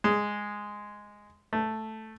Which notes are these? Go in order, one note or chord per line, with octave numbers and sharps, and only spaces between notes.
G#3
A3